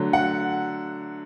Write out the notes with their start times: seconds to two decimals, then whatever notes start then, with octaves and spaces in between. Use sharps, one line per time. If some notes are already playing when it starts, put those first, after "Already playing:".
Already playing: D3 F#3 A3
0.13 F#5